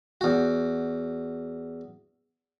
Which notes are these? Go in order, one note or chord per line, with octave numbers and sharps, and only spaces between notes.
E2 F#4